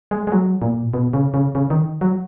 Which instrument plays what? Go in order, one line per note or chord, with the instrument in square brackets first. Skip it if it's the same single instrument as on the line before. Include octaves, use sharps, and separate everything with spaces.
[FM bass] G#3
G#3
F#3
A#2
B2
C#3
C#3
C#3
D#3
F#3